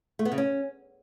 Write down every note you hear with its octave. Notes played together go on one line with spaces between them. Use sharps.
A3
B3
C#3
C#4